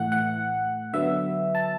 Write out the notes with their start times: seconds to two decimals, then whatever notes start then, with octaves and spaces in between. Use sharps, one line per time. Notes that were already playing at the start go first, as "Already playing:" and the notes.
Already playing: A2 E3 A3 F#5
0.12 F#5
0.93 D3 F#3 B3 E5
1.55 A5